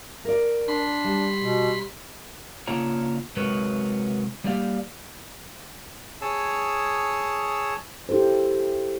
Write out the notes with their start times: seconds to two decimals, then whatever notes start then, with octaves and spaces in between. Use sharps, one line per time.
0.25 A#4 D5
0.68 D4 B5 C6
1.04 G3
1.40 B2
2.67 C#3 A#3 D4 F4 C#5 A#5
3.37 C3 F#3 G#3 A#4 B4 C#5
4.44 G3 A#3 G4 D5 F5
6.22 G#4 C#5 A5 D#6 E6
8.09 E4 G4 A4 C5